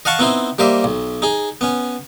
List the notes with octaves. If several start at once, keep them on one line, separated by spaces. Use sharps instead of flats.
D#5 F5 F#5 A5 C#6
B3 C4 D#4 E4 C5
G3 A#3 C5 D#5 E5
B1
D#4 G#4
B3 C#4